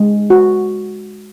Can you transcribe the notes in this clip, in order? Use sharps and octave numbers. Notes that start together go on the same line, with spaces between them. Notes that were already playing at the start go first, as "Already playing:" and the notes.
Already playing: G#3
F#4